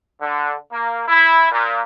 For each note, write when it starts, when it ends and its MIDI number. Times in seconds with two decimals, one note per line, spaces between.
0.22 0.55 50
0.72 1.04 58
1.08 1.50 64
1.52 1.81 46